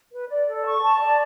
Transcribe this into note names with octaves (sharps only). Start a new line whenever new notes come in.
B4
D5
A4
C#6
A5
D5